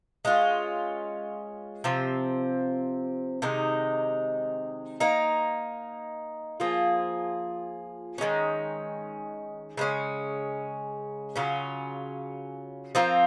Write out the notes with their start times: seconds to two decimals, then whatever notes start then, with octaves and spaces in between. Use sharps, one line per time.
0.25 G#3 C#4 F4
1.84 C3 F3 C4
3.42 C3 D#3 G#3 D#4
5.00 A#3 D#4 A#4
6.60 F3 A#3 F4 G#4
8.18 D#3 G#3 C#4
9.77 C#3 G#3 C#4
11.36 C#3 F#3 C#4 F4
12.95 F3 C4 F4 A#4